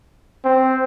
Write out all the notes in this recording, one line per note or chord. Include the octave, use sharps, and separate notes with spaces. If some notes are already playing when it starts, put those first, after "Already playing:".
C4